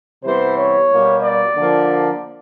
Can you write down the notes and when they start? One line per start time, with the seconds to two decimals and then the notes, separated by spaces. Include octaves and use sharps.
0.24 C3 E3 G3 B3 C5
0.57 C#5
0.90 B2 G3 A#3
1.23 D5
1.56 D3 F3 A#3